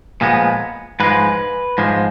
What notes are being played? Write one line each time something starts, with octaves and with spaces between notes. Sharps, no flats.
A#2 F3 G#3 B3
G#2 F3 G#3 B4
G#2 F3 G#3